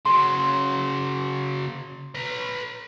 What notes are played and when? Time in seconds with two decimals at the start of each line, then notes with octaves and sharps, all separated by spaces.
0.06 C#3 F#3 C6
2.15 B4 A#5